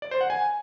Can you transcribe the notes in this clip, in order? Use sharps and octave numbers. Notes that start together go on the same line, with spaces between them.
D5
C5
F#5
G#5